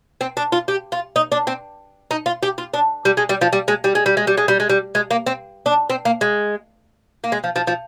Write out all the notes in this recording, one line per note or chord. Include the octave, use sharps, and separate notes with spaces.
C4
D4
F4
G4
F4
D#4
D4
C4
D#4
F4
G4
F4
D4
G3
G#3
G3
F3
G3
G#3
G3
G#3
G3
G#3
G3
G#3
G3
G#3
G3
G#3
A#3
C4
D4
C4
A#3
G#3
A#3
G#3
F3
F3
F3